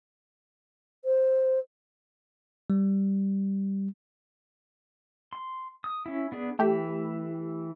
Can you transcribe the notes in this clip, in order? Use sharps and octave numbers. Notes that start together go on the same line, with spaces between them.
C5
G3
C6
D#6
C#4 E4
B3 D4 G#4
E3 A3 E4 G4